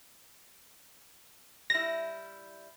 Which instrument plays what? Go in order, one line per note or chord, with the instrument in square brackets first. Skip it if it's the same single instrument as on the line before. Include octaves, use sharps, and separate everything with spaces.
[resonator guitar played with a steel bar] G3 E4 [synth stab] A#6